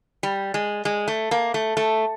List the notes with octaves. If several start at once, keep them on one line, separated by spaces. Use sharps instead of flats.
G3
G#3
G#3
A3
A#3
A3
A3